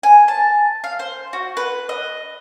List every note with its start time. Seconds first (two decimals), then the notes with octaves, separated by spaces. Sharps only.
0.03 G#5
0.28 A5
0.84 F5
0.99 C5
1.33 F#4
1.57 B4
1.89 D#5